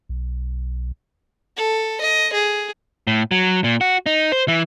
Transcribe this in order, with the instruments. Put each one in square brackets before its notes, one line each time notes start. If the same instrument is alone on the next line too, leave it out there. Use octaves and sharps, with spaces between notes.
[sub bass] B1
[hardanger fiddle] A4
D#5
G#4
[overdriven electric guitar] A2
F#3
A#2
F#4
D#4
C5
E3